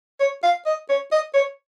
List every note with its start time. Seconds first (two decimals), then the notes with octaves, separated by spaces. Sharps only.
0.20 C#5
0.43 F5
0.66 D#5
0.89 C#5
1.12 D#5
1.34 C#5